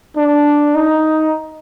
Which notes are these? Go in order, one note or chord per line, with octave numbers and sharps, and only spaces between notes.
D4
D#4